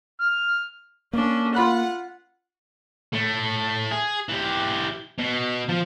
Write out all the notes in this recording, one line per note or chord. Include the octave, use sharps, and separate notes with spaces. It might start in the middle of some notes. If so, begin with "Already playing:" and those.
F6
A#3 C#4 D4
F4 F#5 B5 F#6
A2 A3
G#4
E3 G4
B2
F3